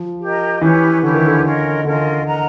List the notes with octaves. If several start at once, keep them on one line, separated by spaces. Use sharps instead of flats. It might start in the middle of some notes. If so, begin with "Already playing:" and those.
Already playing: F3
G4 A#4 D#5
E3 C#4 E4 G4 B4
D3 C#4 E4 G4 B4
D#3
D3
C#4 F4 A#4 D#5
D3 C#4 F4 A#4 D#5
A#4 D#5 F#5 A#5